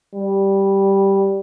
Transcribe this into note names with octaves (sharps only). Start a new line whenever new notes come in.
G3